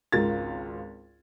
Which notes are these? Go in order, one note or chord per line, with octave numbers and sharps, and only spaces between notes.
G#1 C#2 F4 A#4 A6